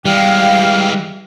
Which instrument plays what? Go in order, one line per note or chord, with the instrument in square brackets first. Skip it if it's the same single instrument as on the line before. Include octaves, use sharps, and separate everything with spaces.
[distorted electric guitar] E3 G#3 [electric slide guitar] G3 [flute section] F5 G5 F6